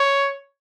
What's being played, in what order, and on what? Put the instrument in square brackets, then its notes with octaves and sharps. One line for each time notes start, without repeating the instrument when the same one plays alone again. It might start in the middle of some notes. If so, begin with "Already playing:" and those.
Already playing: [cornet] C#5